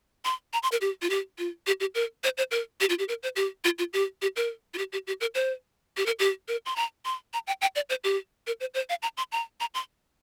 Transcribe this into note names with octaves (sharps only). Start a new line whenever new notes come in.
C6
A#5
C6
A#4
G4
F4
G4
F4
G4
G4
A#4
C5
C5
A#4
G4
F4
G4
A#4
C5
G4
F4
F4
G4
G4
A#4
F4
G4
G4
G4
A#4
C5
G4
A#4
G4
A#4
C6
A#5
C6
A#5
G5
G5
D5
C5
G4
A#4
C5
C5
F5
A#5
C6
A#5
A#5
C6